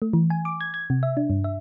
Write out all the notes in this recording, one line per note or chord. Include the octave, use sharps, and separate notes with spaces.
A3
E3
G#5
D6
G#6
G#6
C3
E5
D4
G2
E5